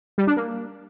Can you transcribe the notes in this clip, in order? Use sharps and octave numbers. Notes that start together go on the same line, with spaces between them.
G3
D4
A#3